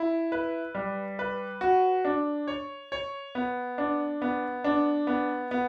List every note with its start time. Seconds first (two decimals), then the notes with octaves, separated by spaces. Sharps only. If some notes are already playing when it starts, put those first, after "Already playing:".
Already playing: E4
0.32 B4
0.75 G3
1.19 B4
1.61 F#4
2.05 D4
2.47 C#5
2.92 C#5
3.35 B3
3.78 D4
4.22 B3
4.64 D4
5.07 B3
5.51 B3